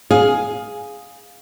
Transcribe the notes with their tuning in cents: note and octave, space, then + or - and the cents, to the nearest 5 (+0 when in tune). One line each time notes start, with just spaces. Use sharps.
G#4 +0 F5 +15